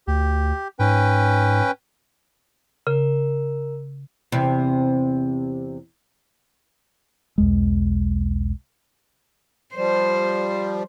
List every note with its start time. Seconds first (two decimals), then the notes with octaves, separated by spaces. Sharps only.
0.07 D2 G4
0.79 G#2 C#4 B4 G5
2.87 C#3 A#4
4.32 E2 C3
7.38 B1 E2 G#3
9.76 F3 G3 C5